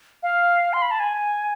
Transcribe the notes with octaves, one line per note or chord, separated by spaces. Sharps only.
F5
C6
B5
A5
G#5